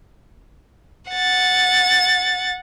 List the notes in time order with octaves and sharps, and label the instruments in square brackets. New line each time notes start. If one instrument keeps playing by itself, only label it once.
[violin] F#5 A6